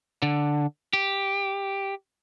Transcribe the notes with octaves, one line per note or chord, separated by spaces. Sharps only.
D3
G4